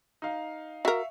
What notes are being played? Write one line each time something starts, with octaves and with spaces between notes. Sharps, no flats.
D#4 F5
F#4 A#4 E5 F5 C#6